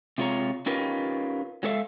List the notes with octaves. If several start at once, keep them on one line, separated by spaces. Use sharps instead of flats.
C3 G#3 F4 C5 C#5 A#5
C#4 D#4 F4 G4 A#4 B4
F#3 G#3 A4 C#5 E5 F5